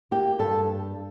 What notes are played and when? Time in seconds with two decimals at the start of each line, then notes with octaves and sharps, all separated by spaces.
0.11 A#3 G4
0.39 G2 A4